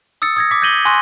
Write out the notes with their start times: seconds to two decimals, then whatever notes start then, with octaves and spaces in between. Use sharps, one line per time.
0.22 D#6 E6 A6 C#7
0.36 D#6 G#6 A#6
0.51 D6 B6
0.62 G6 G#6 A#6 D#7 F#7 G7
0.85 G#5 C6 C#6 F#6 A#6 D#7